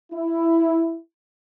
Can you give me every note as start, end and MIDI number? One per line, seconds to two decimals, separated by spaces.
0.13 0.99 64